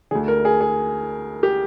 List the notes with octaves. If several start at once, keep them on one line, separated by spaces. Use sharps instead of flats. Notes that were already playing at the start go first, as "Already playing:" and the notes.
D2 D3 G#4
A#4
G#4
G#4
G4